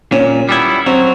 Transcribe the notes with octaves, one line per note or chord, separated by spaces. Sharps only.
A#2 C#4
G3 B3 E4
F#3 C4